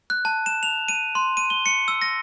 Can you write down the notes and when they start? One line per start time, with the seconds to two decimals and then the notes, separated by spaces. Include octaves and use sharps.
0.10 F#6
0.25 A5
0.46 E7
0.63 F7
0.88 D#7
1.15 C6
1.37 D#7
1.50 G7
1.66 C#7
1.88 E6
2.02 A#6